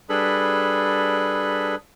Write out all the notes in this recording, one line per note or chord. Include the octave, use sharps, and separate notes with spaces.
G3 D4 G#4 A4 B4 B5